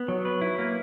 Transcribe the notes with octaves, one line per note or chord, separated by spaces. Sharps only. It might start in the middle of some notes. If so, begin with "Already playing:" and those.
Already playing: B3
F#3
B4
E4
A#3